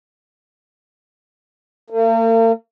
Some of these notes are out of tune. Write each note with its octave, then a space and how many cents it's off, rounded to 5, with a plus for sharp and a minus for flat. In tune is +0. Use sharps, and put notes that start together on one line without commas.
A#3 -45